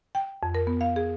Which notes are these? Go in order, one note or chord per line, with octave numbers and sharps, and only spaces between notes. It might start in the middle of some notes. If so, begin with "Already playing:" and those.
G5
F2
A#4
B3
F5
G#4